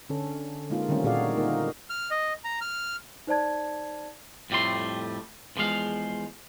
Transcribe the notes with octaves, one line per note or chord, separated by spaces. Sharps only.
D3 C#4 A4
G#3 A#3 D#4 F4
D3 D#3 G3 A3 C4 C#4
A#2 D#4 F#4 G#4 D5 F5
A#3 D#4 A#4
F6
D#5
A#5
F6
D#4 C5 D5 A5 G#6
F2 A2 G3 A3 C6
E2 E3 F3 G#3 F5